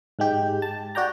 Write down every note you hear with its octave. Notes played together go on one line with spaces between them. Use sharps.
G#2 G#3 G4
A5
F#4 D5 G5 A#5